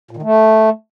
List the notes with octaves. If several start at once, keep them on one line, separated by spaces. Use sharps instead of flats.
A#2
D#3
A3